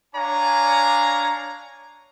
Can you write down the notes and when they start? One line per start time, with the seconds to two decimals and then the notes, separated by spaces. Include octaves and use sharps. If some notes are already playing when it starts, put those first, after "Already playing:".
0.15 D4 C#5 D5 F5 G#5 A#5